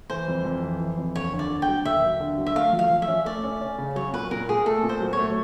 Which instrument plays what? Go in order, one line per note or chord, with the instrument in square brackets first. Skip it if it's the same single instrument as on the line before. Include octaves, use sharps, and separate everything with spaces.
[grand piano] E3 [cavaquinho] C5
[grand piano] F2
F2
E3
E3
F2
[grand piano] D#2 [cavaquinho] C#5
[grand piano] D3
[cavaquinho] D5
[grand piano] D3
[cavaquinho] G5
[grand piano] F#3
[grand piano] D#2 [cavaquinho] E5
[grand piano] D#2
D3
F#3
[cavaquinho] E5
[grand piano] A3 [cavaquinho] F5
[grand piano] F3
[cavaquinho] F5
[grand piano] F3
[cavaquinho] E5
[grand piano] C#4
[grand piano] A3 [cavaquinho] D5
[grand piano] C#4
C#4
C#3
[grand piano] F#3 [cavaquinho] C#5
[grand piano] A#2 [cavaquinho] B4
[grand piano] A#2 [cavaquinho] A#4
[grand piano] A#2 [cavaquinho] G#4
[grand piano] A3 [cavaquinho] A4
[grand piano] A#2
[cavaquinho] C5
[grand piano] F#3
[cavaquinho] C#5
[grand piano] A3